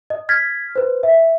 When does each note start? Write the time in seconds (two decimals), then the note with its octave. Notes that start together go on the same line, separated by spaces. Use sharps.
0.10 D#5
0.29 F6 G#6 A6 B6
0.76 B4 C5
1.03 E5